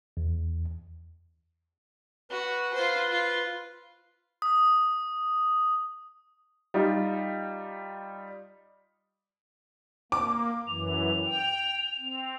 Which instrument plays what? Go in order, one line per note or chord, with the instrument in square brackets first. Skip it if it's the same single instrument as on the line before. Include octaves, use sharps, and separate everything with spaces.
[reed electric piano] E2
[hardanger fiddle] F#4 [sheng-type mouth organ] B4
[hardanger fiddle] F4 C5
F4
[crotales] D#6
[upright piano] G3 D#4 F4
[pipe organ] A#3 [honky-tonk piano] D6
[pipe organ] F#2 E3 [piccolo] F7
[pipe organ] G5
C4